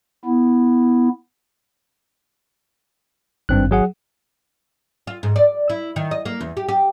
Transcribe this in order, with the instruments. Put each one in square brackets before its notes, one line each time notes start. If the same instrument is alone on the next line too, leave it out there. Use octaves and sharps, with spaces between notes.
[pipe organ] B3 E4
[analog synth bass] G#1 [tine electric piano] G2 C4 F#6
[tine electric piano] F#3 G#4 F#5
[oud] F4
G#2
D5
E4
D#3
D#5
A#3
E2
G4
G4